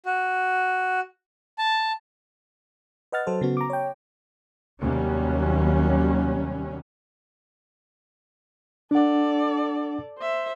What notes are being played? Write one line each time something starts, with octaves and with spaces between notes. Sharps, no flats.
F#4
A5
B4 D#5 F#5 F6 A6
F#3 A4 C5
C#3 B3 F#4
A#5 D6
C#5 G5
D#2 C3 F#3 G3 C#4
D4 A4 D5 F#5
C5 E5